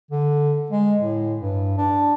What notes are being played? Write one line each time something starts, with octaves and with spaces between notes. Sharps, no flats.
D3
G#3
A2
G2
D4